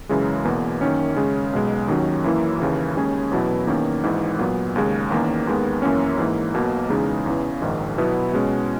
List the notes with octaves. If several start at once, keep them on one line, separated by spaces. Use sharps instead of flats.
F#2 C#3 E3 G#3
E2 B2 A#3
F#2 D#3 A#3 C#4
C#3 G#3 C#4
B1 B2 G#3
D#2 D#3 F#3 C#4
F#2 E3 A#3 E4
D#2 C#3 E3
D#2 C#3 G#3 C#4 G#4
E2 B2 F#3 B3 E4
E2 D#3 A#3 C#4
G#1 G#2 E3
A#2 F#3 B3
D#2 C#3 G#3
E2 D#3 A#3 C#4
D#2 D#3 G#3 B3
F#2 E3 A#3 C#4
G#2 E3 A#3
B1 B2 A#3
E2 C#3 G#3 D#4
E2 C#3 E3
A#1 G#2 D#3
B2 F#3 B3 E4
B2 G#3 C#4